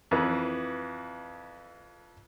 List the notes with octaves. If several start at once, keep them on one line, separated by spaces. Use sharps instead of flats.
F2 E3 B4